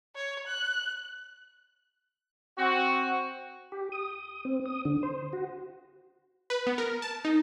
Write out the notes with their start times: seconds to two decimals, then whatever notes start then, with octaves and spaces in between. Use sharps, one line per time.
0.15 C#5
0.47 F#6
2.58 C4 F#4
3.72 G4
3.92 D#6
4.45 C4
4.66 D#6
4.85 D3
5.03 C5
5.33 F#4
6.50 B4
6.67 B3
6.78 A#4
7.02 A5
7.25 D#4